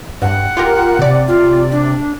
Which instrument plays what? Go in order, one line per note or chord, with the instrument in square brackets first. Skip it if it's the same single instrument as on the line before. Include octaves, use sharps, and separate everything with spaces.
[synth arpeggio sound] G2 [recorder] F#5
[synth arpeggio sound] F4 G4 A#4
C3 D5
[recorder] F4
D4